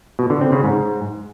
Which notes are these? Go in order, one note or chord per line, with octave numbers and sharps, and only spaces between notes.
B2
D3
C4
C#3
G#2